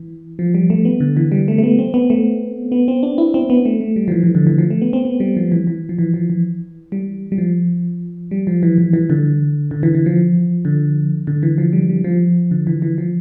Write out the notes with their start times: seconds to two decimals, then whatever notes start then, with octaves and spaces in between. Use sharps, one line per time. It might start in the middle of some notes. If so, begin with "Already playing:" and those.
Already playing: E3
0.39 F3
0.55 G3
0.70 A3
0.85 B3
1.00 D3
1.17 E3
1.32 G3
1.48 A3
1.58 A3
1.63 B3
1.79 C4
1.94 B3
2.10 A3
2.72 B3
2.88 C4
3.03 D4
3.18 E4
3.34 C4
3.50 B3
3.65 A3
3.81 A3
3.96 G3
4.08 F3
4.12 E3
4.23 E3
4.35 D3
4.47 E3
4.58 F3
4.70 A3
4.82 B3
4.93 C4
5.05 B3
5.20 G3
5.37 F3
5.52 E3
5.67 E3
5.89 F3
5.98 E3
6.14 F3
6.30 E3
6.92 G3
7.32 G3
7.38 F3
8.31 G3
8.47 F3
8.63 E3
8.78 E3
8.93 E3
9.10 D3
9.71 D3
9.83 E3
9.95 E3
10.06 F3
10.65 D3
11.27 D3
11.43 E3
11.58 F3
11.73 G3
11.89 G3
12.04 F3
12.51 D3
12.67 E3
12.82 E3
12.98 F3